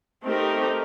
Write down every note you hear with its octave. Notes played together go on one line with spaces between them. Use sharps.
A3 C4 D#4 G4 A#4